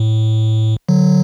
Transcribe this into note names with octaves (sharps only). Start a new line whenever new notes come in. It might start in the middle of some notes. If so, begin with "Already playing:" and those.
Already playing: A2
D3 F#3